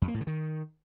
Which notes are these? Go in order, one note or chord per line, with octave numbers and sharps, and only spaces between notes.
F2
A#3
A2
D3
D#3